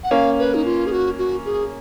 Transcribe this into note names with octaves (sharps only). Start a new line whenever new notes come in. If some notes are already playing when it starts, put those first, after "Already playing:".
F#5
A#3 C#4 F5
B4
D#4
F4
G#4
F#4
F#4
G#4